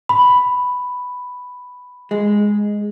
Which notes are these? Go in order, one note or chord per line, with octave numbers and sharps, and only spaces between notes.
B5
G#3